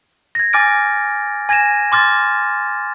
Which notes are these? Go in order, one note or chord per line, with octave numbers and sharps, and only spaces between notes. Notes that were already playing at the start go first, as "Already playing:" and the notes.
G#6 A#6
G#5 D6 F6 A6 D7
G#5 G#6 A#6 D#7 E7
C6 D6 F6 A6